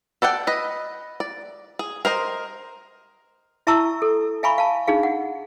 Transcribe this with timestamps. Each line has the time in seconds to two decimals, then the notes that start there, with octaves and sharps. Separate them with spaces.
0.22 A4 D5 F#5 G5
0.47 B4 D#5
1.20 D5
1.79 G#4
2.05 A#4 C5 D#5
3.67 E4 E5 A5 A#5 C#6 E6
4.02 A4
4.43 E5 F5 G#5 A#5 B5 C#6
4.58 F5 A5
4.87 D4 D#4 G#4 F5
5.03 F#5